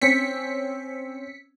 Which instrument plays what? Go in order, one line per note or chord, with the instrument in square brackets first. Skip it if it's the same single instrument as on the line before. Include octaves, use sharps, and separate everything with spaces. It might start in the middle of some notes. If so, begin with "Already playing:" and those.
[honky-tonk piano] C4 C#4 [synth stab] B6 C#7